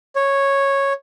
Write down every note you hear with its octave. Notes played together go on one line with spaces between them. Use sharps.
C#5